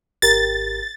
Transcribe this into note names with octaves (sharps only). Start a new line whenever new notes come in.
G#1 G4 A#4 A6